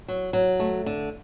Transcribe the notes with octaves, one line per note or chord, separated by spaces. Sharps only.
F#3
F#3
A3
D3